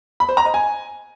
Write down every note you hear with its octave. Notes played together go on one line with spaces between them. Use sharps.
B5
C5
A#5
D#5
G#5